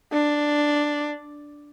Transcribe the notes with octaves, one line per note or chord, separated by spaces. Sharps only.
D4